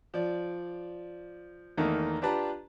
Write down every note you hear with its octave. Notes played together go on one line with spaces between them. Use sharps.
F3 D5
E2 D#3 A3 A#3 D#4
D4 F4 G4 B4 A5 A#5